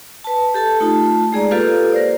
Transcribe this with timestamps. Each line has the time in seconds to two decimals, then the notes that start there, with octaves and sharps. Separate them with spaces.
0.24 B4 A5
0.54 G4 A4 A5
0.80 A3 D#4 F4 A5
1.33 G#3 G#4 D5 A#5
1.51 A#3 F4 G4 A4 B4 F5
1.92 A#4 C5 D5